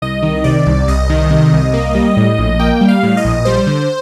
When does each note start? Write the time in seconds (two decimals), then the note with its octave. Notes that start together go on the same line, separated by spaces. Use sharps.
0.02 C2 D#5
0.22 D#3
0.44 C3 D5
0.66 C2
0.88 C2 D#5
1.10 D#3
1.30 C3
1.52 C2
1.73 A#3
1.95 G3
2.17 A2
2.38 A#1
2.59 A#3 G5
2.81 G3
2.88 F5
3.03 A2
3.17 D#5
3.25 A#1
3.45 G3 C5
3.67 D3